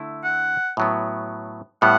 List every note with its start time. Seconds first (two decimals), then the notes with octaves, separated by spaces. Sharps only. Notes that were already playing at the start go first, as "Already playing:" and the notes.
Already playing: D3 A3 E4
0.24 F#5
0.77 A2 F#3 B3
1.82 A2 G3 B3 F#5